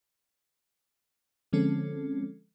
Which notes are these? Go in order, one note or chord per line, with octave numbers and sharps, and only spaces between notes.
D3 F3 G#3 C4 C#4 A4